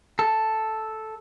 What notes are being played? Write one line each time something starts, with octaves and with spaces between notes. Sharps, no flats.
A4